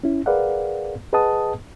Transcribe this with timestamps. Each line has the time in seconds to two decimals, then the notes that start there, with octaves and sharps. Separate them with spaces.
0.04 C#4 E4
0.26 G#4 A#4 B4 D5 F5 F#5
1.13 G#4 B4 D#5 F#5 A5 D#6